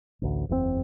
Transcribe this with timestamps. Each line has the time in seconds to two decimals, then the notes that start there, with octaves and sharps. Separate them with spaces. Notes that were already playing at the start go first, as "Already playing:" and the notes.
0.22 A1 D2
0.49 F#1 E2 A#2 C4